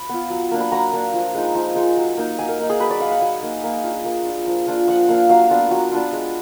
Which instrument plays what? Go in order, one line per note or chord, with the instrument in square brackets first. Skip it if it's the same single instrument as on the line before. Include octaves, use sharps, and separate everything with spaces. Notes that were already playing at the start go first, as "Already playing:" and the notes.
Already playing: [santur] B5
B3 F4
F#3
A#3 D4
B5
F#3 A#5
A#3 D4
F3
G#3 D#4
F3
G#3 D#4
F#3
A#3 D#4
F#3 G#5
A#4
A#3 D#4
G#4
F#3 B4
D5
A#3 D#4 F5
F#5
F#3 G#5
A#3 D#4
A#3
D4 F4
A#3
D4 F4
F3
A#3 D4 F4
F3 F#5
A#3 D4 F4 F5
F#3 F5
B3 D4 F4 A#5
F#3
B3 D4 F4
G#3